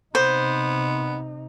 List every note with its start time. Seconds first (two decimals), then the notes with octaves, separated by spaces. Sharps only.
0.15 C3 B3 D#4 C5